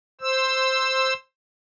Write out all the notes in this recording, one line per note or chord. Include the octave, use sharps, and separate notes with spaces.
C5 E6